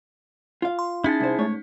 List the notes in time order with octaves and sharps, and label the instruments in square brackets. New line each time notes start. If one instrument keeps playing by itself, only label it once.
[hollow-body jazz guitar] F4 F5
[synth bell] C6
[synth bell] C#4 D#4 [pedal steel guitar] E4 G#4 A5
[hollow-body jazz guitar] C2 C5
G#2 A3 C#5